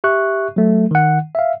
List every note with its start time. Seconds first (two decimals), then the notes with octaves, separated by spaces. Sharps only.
0.04 G4 E5 C#6 F#6
0.56 F#3 A3
0.91 D#3 F#5
1.35 E5 F5